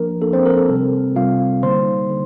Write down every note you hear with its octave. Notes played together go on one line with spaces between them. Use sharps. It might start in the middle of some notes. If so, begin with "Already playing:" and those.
Already playing: F3 A#3 D4 A#4
F3 A#3 D4 A4
C4 C5
A#4
A4
C3 G3 C4
C3 G3 C4 F4 F5
D3 G3 A#3 D#4 C5 C6
D3